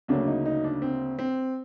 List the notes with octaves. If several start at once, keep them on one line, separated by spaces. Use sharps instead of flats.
D2 C#3 F#3 A#3 D4
D#4
D#4
D4
C4
C4